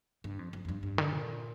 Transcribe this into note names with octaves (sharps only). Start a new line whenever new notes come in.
G2
F2
F2
F2
G2
G2
D3
A#2